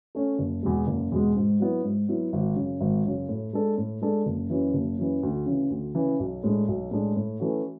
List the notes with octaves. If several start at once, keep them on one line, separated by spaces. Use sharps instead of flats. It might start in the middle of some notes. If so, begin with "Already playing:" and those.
A3 C#4
F#1
E2 B2 G#3
F#1
E2 B2 G#3
G#2
F#3 B3 E4
G#2
F#3 B3 E4
G#1
F#2 C#3
G#1
F#2 C#3
A2
G#3 D4 A4
A2
G#3 D4 A4
F#1
F#2 E3
F#1
F#2 E3
D2
C#3 E3
D2
C#3 E3
B1
A2 G#3 D4
B1
A2 G#3 D4
A2
E3 A3 C#4 F#4